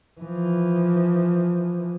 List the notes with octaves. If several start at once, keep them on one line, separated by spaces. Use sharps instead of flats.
E3 F3